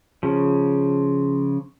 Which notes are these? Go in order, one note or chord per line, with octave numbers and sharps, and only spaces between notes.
C#3 F3